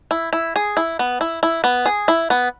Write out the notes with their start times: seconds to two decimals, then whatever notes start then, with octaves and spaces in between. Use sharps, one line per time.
0.11 E4
0.33 E4
0.56 G#4
0.77 E4
0.99 B3
1.21 E4
1.43 E4
1.64 B3
1.86 G#4
2.08 E4
2.30 B3